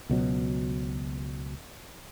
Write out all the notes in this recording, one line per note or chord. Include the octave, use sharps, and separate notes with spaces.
C#2 B2 F#3